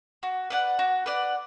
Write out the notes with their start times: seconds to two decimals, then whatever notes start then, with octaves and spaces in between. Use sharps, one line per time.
0.23 F#4
0.50 B4 D5 F#5
0.79 F#4
1.06 B4 D5 F#5